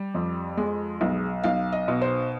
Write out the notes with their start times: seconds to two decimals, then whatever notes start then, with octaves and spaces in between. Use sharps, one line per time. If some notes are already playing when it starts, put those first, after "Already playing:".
Already playing: G3
0.15 F2
0.57 G#3
1.01 B1
1.43 B1 F5
1.72 D#5
1.88 B2
2.01 C5